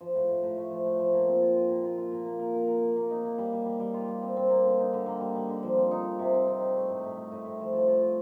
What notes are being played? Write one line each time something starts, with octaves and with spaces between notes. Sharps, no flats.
F3
A2
A2
A2
A3
F3
A3
F3
A#2
C4
F4
F4
A#2
F4
F4
A#2
A#3
A#4
A#4
A#4
A#3
A#3
D#4
A#3
G3
G3
G3
G3
F4
G3
C4
C4
A#3
D3
D#4
D3
A#3
G3
G3
D3
F3
C4
D#4
D#4
C3
C4
C4
D#4
A3
A2
A2
A3
A2
A2
F3
F3
F4
F4